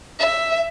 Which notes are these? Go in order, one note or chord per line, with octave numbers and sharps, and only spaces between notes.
E5